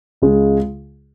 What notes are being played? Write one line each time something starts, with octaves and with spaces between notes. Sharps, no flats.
C#2 C#3 G#3